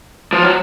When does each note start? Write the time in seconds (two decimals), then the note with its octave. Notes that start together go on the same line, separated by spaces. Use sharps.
0.33 F3
0.43 F#3